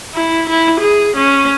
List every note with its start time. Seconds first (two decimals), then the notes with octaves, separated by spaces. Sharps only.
0.14 E4
0.49 E4
0.80 G#4
1.16 C#4